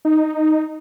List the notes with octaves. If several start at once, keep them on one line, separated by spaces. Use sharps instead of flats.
D#4